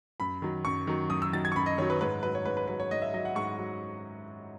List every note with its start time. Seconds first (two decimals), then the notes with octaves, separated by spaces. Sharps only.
0.20 F#2 B5
0.42 D#3 F#3
0.65 F#2 C#6
0.87 D#3 F#3
1.10 F#2 D#6
1.22 E6
1.33 D#3 F#3 A6
1.45 G#6
1.52 C#6
1.56 F#2 B5
1.66 D#5
1.78 D#3 F#3 C#5
1.90 B4
2.01 G#2 B4
2.23 F#3 B4
2.35 C#5
2.45 G#2 B4
2.57 B4
2.68 F#3 B4
2.80 C#5
2.91 G#2 D#5
3.02 E5
3.14 F#3 D#5
3.25 F#5
3.35 G#2 C#6
3.59 F#3